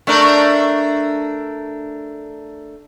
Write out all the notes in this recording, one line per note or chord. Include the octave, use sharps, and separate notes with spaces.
A3 D4 A#4